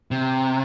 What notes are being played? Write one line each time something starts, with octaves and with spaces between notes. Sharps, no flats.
C3